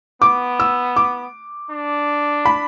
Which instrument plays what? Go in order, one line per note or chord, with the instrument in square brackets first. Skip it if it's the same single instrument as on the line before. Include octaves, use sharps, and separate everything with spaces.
[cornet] B3 [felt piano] D6
[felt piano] E6
D6
[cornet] D4
[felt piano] B5